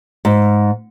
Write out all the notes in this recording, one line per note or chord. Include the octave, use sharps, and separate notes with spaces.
G#2